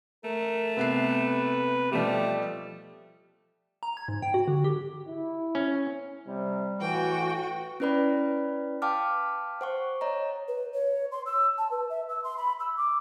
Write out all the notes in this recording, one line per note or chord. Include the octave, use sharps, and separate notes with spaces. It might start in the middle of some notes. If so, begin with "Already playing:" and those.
A3 A#4
C3 B3 B4 C7
B2 F3 G3 A3 G4
A#5
G#6
G#2
G5
F#4
D3
G4
E4
C#4
C3 G3
A2 E3 F#4 G5
C#4 E4 B4 D5 B5
F5 G5 A5 D6 F6
C5 F#5 C#6
C#5 D#5 A#5
B4
C#5
C6
E6
A5
B4
E5
E6
C6
B5
E6
D6